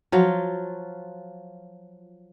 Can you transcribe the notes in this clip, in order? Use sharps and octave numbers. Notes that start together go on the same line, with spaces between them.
F3 F#3 F4